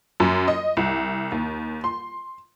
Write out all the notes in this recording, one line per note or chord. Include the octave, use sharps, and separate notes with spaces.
F#2
D#5
C2
D#2
C6